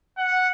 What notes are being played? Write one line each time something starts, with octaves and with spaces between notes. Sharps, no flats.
F#5